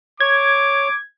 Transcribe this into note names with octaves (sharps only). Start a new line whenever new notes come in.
C#5 D6 G#6